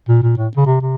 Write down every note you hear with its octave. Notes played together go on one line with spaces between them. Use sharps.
A#2
A#2
A2
C#3
C3
C3